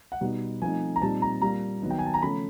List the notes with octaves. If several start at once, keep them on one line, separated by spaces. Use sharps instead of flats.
F#5
B2 G3 B3 D#4
F3 A3 C4 D#4 G#5
A#5
A#2 G3 C4 D#4 A5
A#5
A#2 G3 A#3 A#5
D#3 F#3 B3 D#4
G5
G#5
A5
A#5
C#3 F3 A3 C#4 B5